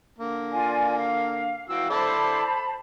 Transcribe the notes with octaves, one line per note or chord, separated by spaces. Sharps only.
D3 A#3
F4 D5 G#5
F5
E3 F#4 F5 G5 E6
E4 A4 C5 D5 A5 B5